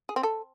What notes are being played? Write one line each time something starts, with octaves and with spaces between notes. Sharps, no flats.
G#4
C4
A4